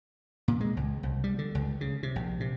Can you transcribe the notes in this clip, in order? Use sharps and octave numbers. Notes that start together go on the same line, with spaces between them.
A#2
G#3
C#2
C2
G3
D3
C#2
C#3
C3
A#1
C3